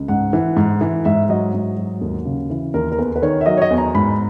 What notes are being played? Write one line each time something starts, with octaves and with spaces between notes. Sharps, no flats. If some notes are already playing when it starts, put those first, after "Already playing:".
Already playing: C#2
G#2 F#5
E3
G#2
E3
G#2 E5
F#3 D#5
G#2
F#3
D#2
C#3
E3
D#2 A#4
A#4
E2 B4
B4
D#3 C#5
E5
F#3 D#5
C#5
D#5
E2
A#5
G#2 B5